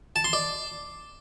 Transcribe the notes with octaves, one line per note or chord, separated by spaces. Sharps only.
A5
C6
D5